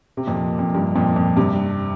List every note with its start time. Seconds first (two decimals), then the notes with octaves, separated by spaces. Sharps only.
0.17 C3
0.27 F2 A#2
0.59 F2
0.75 G2
0.95 F2 A#2
1.16 F2 A#2
1.37 G2 C3